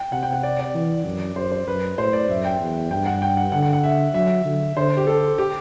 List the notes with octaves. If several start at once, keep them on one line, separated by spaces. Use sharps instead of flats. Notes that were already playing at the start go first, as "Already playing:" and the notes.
Already playing: G5
C3 F#5
G5
F#5
D5
D5
E3
F#2
F#2 C5
C5
F#2 B4
A2 C5
D5
F#2 E5
G5
E2
G2 G5
F#5
G5
F#5
D3 F#5
F#5
F#5
E5
F#3 E5
D3
D3 C5
G4
A4
G4